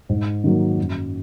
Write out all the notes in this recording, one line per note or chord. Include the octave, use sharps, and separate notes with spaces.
G#2
D#3 F#3 A#3
F#2